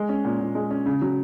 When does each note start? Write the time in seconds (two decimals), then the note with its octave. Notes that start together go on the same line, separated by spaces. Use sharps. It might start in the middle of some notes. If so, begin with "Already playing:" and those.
Already playing: G#3
0.09 C#4
0.25 A#2
0.40 A#2
0.55 G#3
0.71 C#4
0.86 C#3
1.02 F#3